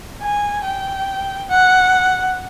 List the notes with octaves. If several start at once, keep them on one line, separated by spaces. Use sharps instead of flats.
G#5
G5
F#5